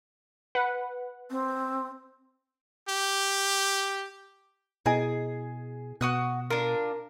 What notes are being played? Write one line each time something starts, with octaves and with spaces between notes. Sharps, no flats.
B4 F#5
C4
G4
B2 E4 G#4 D#5 G#5
B2 F#4 D#6 F#6
D4 F4 A#4